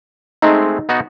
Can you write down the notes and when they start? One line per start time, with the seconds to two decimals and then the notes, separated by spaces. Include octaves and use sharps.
0.42 G#3 A3 C4 D#4
0.89 B3 D#4 F#4